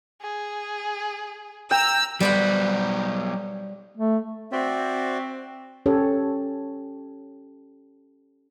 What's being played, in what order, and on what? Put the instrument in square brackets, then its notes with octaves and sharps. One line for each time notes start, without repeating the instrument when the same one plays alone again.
[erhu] G#4
[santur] G5 [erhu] A#5 [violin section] E6
[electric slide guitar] F#3 B3 G4 [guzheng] G3 C5 F#5
[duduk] A3
[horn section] C4 [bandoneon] F#4 D5 E5
[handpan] C#4 G4 A4 C#5